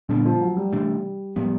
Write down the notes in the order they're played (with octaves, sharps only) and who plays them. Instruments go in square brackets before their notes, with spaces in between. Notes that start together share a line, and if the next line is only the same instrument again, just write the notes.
[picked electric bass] A#2 G3 B3 D4 [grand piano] D3
[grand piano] F3
F#3
G3
[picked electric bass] C3 E3 A3 D4 [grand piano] G3
[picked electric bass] A2 F3 G#3 B3 [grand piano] G3